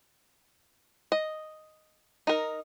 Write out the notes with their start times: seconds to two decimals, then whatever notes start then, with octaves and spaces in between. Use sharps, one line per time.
1.12 D#5
2.27 D#4 A#4